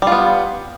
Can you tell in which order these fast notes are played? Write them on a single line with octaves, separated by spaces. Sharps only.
G3 F4 B3